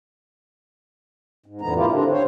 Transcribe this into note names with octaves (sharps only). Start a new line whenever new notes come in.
G#2
F2 A#2 D3 E3 B3 A#5
A2 A#3 E4 F4 G4
D3 C4 D4
C5 C#5